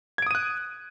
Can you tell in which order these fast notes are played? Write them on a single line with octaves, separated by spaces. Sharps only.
G#6 D7 D#6 D#7 F#6